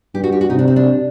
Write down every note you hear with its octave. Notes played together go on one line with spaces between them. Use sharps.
G2 G4
F#4
G4
F#4
C3 D#4
D4
C4
D4